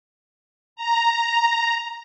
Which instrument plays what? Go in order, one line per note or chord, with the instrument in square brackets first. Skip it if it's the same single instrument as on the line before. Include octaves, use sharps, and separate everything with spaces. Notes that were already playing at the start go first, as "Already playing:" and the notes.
[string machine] A#5